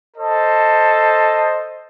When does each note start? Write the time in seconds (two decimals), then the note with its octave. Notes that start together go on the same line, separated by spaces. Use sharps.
0.17 A4 C5 D#5